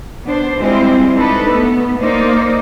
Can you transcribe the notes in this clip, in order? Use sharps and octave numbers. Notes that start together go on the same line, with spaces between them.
B3 D4 C5
G3 G#3 C4 E4 F4 C5
D4 D#4 A4 B4
A3 B3
A#3 D#4 C5 D5